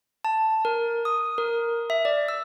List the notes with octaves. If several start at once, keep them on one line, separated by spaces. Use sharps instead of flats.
A5
A#4
D#6
A#4
E5
D5
E6